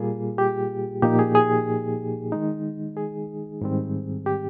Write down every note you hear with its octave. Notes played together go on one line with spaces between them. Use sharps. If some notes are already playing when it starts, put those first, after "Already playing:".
Already playing: A#2 G3 A#3 F4 G#4
G4
A#2 F3 A#3 D#4 G4
G#4
G#4
D#3 G#3 D#4
G#4
G#2 D#3 G3 C4
G4